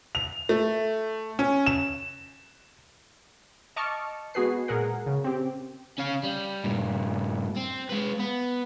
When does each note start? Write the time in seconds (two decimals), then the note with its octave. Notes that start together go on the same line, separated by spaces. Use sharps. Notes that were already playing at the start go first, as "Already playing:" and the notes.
0.15 F7
0.49 A3
1.39 C#4
1.66 E7
3.76 D#5 A5 C#6 D6 F6 C#7
4.34 G#3 B3 F#4 G#4 B4 C7
4.68 A#2 G#4 A#4 F#5
5.06 C#3
5.24 C4 G4
5.98 C#4 F5
6.23 G3
6.64 G2 A#2
7.57 C4
7.90 G#3 B4
8.20 B3